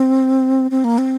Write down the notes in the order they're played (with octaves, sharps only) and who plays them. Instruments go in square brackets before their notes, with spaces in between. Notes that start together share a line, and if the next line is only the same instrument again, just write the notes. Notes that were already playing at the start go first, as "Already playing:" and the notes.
Already playing: [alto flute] C4
C4
A#3
C4